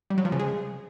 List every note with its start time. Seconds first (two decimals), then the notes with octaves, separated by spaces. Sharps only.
0.10 G3
0.18 F#3
0.25 F3
0.32 C#3
0.39 G#3